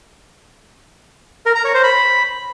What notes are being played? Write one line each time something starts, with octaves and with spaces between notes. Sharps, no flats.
A#4
A#5
C#5
C5
B5